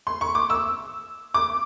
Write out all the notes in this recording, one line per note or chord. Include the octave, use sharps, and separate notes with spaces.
C6
C#6
D6
E6
D6